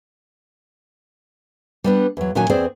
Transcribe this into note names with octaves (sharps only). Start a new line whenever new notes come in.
G3 B3 D4
E2 F#3
A#2 D#3 F#3 C#4 F#4 G#5
E2 C4 G#4 C5 D5